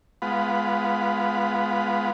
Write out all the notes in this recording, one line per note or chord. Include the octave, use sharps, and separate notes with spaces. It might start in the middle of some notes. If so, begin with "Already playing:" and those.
G#3 B3 F4 F#5 B5